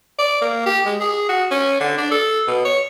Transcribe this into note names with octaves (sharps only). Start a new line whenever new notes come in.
D5
A#3
G4
G#3
G#4
F#4
C#4
D3
D4
A4
B2
C#5